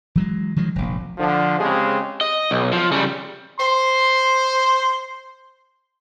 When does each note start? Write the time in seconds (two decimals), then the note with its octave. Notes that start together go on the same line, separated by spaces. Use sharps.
0.15 E3 F#3 G#3
0.56 D#3 F3 F#3 G#3
0.76 F1 A#1
1.18 D3 F3
1.59 C#3 G#3 C4 G4 G#4
2.21 D#5
2.51 B1
2.73 F3
2.92 C#3 G3
3.60 C5 C6